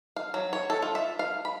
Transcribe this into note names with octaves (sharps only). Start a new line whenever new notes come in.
F5
F#3
C#5
A4
F4
E5
F5
B5